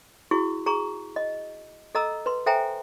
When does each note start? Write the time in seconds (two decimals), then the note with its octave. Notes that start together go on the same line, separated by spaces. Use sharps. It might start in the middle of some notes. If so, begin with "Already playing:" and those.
0.31 E4 F#4 G#4 C#6
0.66 G#4 A#5 C#6
1.16 D#5
1.95 A4 D#5 A#5 E6
2.26 B4 C6
2.46 A4 C5 E5 G5 G#5 A#5